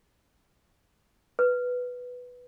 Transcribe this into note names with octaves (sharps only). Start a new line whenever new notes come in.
B4